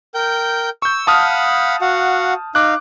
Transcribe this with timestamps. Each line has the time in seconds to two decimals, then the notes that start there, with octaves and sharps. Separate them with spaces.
0.14 A#4 G5 G6
0.82 C#6 E6 G6
1.07 F5 F#5 A5 B5 D#6 F6
1.81 F#4 F5 F#5
2.55 D#4 F5 D6 F#6